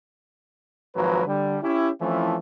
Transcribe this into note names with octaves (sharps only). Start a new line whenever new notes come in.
G#1 F3 F#3 A#4 B4
D3 G3
C#4 E4 G4
E3 F3 A3 C4 C#4 E4